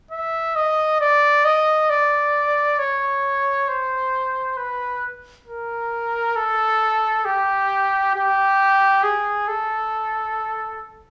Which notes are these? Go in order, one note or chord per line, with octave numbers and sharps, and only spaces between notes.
E5
D#5
D5
D#5
D5
C#5
C5
B4
A#4
A4
G4
G4
G#4
A4